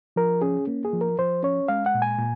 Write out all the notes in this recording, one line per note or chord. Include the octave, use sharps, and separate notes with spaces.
F3 A#4
C#4 G#4
A#3
G#4
F3
A#4
F3 C5
C#4 C#5
G#3 F5
F#5
A#2
G#5
A#2